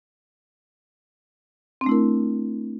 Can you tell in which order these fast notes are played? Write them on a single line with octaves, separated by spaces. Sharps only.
C4 D4 A3 E4 A#4